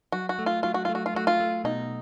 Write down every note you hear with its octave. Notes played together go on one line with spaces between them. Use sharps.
F#3 F#4
F#4
A3
F4
F#3 F4
F#4
A3 F4
F#4
F4
A3 F#4
F4
A3
B2 D#4